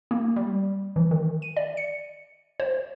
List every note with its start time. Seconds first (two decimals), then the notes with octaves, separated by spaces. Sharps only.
0.11 A#3
0.36 G3
0.96 E3
1.11 D#3
1.42 D#7
1.57 D5
1.77 C#7
2.60 C5